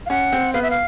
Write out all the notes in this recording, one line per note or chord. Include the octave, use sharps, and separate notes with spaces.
F5
C#4 F#5
C4
B3 F5
E5
F5